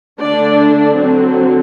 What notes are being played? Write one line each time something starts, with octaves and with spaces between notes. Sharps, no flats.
D3 A3 D4 D5
D3 F#3 C4